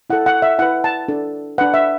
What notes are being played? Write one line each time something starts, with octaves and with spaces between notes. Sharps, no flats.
E4 A4 F#5
F#5
E5
E4 B4 F#5
A5
D4 A4
D4 B4 F#5
E5